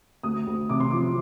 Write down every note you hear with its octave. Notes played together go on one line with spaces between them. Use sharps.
D2 D#6
D2
C3 D6
C6
F3 D6